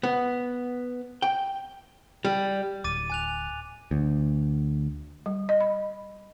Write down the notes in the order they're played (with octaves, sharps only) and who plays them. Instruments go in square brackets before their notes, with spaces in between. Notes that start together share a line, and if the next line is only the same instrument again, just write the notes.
[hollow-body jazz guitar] B3
G5
G3
[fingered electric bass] D1 [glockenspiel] D6 A6 D#7
[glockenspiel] G#5 F#6 F7
[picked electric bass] D2
[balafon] G3
D#5
B5